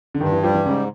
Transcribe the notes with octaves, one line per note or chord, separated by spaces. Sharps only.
D3
G2 D#3
E3
F3 G3
E3
G#2 C#3